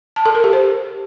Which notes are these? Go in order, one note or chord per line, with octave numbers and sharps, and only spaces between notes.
A5
A4
A#4
G4
C5